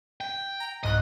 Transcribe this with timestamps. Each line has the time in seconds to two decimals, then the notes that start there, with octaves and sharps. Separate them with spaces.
0.21 G5
0.60 A#5
0.84 C2 G#2 D#5 F#6